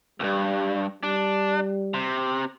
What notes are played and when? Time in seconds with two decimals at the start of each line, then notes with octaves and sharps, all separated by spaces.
0.20 C#2 G2 G3
1.03 G3 D4
1.94 C3